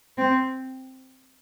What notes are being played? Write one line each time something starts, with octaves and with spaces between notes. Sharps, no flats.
C4